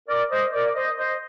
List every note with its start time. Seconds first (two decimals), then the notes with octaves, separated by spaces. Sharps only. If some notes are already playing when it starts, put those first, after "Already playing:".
0.08 A#4 D5
0.31 C5 D#5
0.53 A#4 D5
0.75 C5 D#5
0.98 C5 D#5